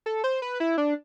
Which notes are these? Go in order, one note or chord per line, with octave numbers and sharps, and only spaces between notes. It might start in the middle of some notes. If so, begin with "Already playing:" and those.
A4
C5
B4
E4
D4